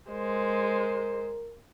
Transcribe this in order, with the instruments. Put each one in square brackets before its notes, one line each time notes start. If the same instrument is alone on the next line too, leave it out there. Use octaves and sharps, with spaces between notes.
[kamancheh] G#3 C5 [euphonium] A#4